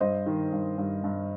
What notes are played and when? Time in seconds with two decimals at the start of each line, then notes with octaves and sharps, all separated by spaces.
0.01 G2 C5 D#5
0.26 D#3
0.52 G2
0.78 G2
1.04 G2